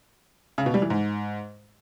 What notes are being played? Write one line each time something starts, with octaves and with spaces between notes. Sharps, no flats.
C#3
B2
G3
E3
G#2